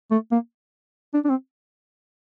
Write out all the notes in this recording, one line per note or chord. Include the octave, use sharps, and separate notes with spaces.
A3
A#3
D4
D4
C4